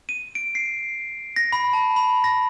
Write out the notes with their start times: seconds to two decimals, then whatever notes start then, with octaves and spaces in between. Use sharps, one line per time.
0.09 D#7
0.35 D7
0.55 C7
1.36 A#6
1.52 B5
1.73 A5
1.96 B5
2.24 A#6